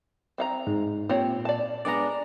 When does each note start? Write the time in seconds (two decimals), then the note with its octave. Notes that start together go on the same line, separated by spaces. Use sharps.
0.38 C4 F5 A#5
0.67 G#2
1.09 A#2 C4 G4 C#5
1.45 D5 A5
1.85 G#3 B3 D4 D5 A#5